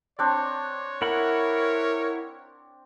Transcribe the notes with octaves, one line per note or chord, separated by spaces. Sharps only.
C4 D4 C#5
E4 A#4 F#5 B5